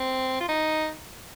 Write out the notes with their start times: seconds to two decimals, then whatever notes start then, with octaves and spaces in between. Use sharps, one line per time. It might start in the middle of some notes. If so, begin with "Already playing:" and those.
Already playing: C4
0.40 F4
0.49 D#4